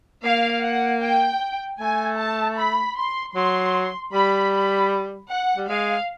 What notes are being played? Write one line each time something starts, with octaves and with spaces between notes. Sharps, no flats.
A#3 F5
F#5
G5
A3 G#5
A5
B5
C6
F#3 C6
G3 B5
B5
F#5
G3
G#3 F5